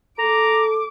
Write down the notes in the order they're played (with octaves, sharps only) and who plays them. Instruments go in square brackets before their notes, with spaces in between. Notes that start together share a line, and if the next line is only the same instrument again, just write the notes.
[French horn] A4 [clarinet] A#5 [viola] D6